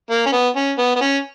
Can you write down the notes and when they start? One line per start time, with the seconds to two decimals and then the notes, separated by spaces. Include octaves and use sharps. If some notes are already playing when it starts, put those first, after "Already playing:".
0.11 A#3
0.26 C#4
0.32 B3
0.56 C#4
0.78 B3
0.96 B3
1.01 C#4